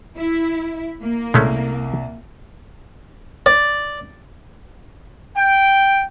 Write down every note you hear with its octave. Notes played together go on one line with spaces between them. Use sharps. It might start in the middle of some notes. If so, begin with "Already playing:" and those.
E4
A#3
C2 G#3 A3 C#4
D5
G5